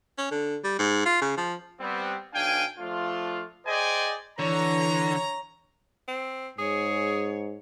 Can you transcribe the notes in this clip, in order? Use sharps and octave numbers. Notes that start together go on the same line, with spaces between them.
C#4
D3
G3
G#2
F4
C#3
F3
G3 B3 C4
B1 D4 F5 G5 G#5
F3 A3 D4 F4
G#4 C5 D5 D#5 G5 G#5
D3 E3 C#5 A#5
C4
G#2 G#4 C#5